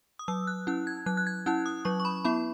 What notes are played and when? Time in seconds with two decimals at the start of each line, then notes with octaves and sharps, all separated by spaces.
0.19 D#6
0.28 F#3 E6
0.47 F#6
0.67 C#4 E4 F#6
0.87 G#6
1.06 F#3 F#6
1.17 F#6
1.27 G#6
1.46 C#4 E4 F#6
1.66 D#6
1.85 F#3 C#6
2.00 C#6
2.05 B5
2.25 B3 E4 B5